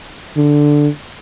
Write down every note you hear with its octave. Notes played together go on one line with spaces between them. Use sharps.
D3